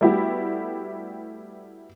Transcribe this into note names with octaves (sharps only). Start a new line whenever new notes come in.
G3 A3 B3 E4 F#4 G4